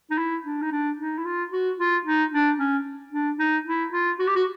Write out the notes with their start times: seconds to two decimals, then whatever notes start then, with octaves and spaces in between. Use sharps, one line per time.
0.11 D#4
0.18 E4
0.45 D4
0.62 D#4
0.72 D4
0.99 D#4
1.18 E4
1.25 F4
1.52 F#4
1.79 F4
2.05 D#4
2.32 D4
2.59 C#4
3.12 D4
3.39 D#4
3.66 E4
3.93 F4
4.19 F#4
4.27 G4
4.35 F#4